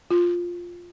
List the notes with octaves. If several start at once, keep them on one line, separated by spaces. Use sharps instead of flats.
F4